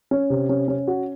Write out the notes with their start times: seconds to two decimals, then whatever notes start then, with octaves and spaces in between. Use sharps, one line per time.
0.11 C#4
0.30 C3
0.49 C#4
0.68 C#4
0.87 F#4